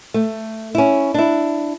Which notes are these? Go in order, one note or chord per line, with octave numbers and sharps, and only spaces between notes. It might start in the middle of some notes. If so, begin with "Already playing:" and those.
A3
C#4 E4
D4 E4